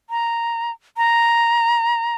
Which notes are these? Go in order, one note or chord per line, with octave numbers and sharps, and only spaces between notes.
A#5
A#5